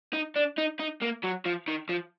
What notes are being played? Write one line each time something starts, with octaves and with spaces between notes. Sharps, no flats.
D#4
D4
D#4
D#4
A#3
F#3
F3
D#3
F3